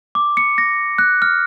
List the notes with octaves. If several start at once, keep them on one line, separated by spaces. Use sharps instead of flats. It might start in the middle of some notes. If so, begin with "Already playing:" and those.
D6
C#7
A#6
F#6
F6